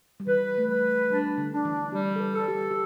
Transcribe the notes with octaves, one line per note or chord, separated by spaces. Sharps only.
G3
E3 B4
A3
G3 B4
G3 D4
D3
D3 D4
E3
G3 G4
A4
B4
A4
G4
G4